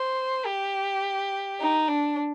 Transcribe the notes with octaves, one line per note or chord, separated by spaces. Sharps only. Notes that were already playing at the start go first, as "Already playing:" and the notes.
Already playing: C5
G4
D#4
D4